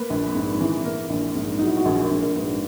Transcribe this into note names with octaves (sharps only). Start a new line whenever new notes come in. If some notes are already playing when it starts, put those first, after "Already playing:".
Already playing: A#3 B4
A#1
G#2
E3
A#3 A#4
A#1
G#2
F#3 D#4
E4
F#4
A#1 G#4
A#4
A#1
A#4
G#2 B4